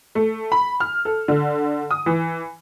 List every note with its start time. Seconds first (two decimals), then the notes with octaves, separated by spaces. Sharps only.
0.15 A3
0.52 B5
0.80 F6
1.05 A4
1.28 D3
1.91 D#6
2.06 E3